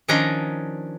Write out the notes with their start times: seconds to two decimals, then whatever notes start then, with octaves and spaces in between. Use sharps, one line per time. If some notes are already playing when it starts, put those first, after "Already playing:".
0.08 D#3 F3 C#4 D4 D#5 A#5